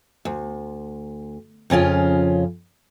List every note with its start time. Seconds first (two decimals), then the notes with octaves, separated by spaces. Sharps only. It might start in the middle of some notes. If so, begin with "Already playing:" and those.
0.25 D2
1.70 F2 C#3 C#4 F4